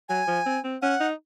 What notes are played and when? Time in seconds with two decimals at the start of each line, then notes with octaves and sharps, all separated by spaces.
0.09 F#3 G#5
0.27 F3
0.46 C4
0.64 C4
0.82 C#4 F#5
1.00 D#4